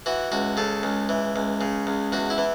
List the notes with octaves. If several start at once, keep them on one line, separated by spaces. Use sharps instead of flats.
E3 F#4
C#2 F#4
C#3 A4
C#2
E3
C#2
C#3
C#2
E2 F#4
E4
E3